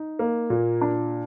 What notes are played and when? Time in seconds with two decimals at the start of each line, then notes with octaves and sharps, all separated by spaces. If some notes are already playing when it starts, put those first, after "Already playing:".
Already playing: D#4
0.19 A#3
0.50 A#2
0.81 D4